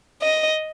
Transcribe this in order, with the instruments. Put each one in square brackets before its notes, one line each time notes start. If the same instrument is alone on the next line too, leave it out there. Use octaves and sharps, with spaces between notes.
[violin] D#5